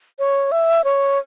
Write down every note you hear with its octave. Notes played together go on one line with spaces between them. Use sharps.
C#5
E5
C#5